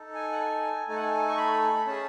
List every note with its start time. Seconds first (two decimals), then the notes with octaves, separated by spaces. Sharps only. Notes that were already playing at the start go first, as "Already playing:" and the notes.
Already playing: D#4 A4
0.15 G#5
0.32 F#5
0.39 G#5
0.88 A3 D#4 A4 G#5
0.96 F#5
1.03 G#5
1.29 C#6
1.37 B5
1.86 C#4 G#4 A5